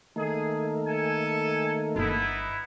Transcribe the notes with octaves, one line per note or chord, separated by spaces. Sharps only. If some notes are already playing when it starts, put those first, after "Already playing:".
D#3 A3 A#3 G#4
A4 G#5
G1 B3 D#4 E4